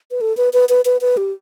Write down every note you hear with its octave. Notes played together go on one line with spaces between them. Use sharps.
B4
A4
B4
B4
B4
B4
B4
G4